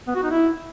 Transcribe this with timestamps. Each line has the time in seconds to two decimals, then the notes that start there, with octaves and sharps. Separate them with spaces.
0.07 B3
0.15 F#4
0.23 D#4
0.31 E4